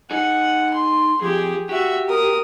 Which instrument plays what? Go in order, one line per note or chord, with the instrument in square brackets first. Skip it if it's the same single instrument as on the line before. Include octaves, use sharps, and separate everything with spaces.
[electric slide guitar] D#4 G#4 [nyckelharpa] F#5
[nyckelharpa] C6
[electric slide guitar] F2 [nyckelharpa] G4 G#4
[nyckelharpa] F#4 E5 [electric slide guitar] G4
[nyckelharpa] A#4 D#6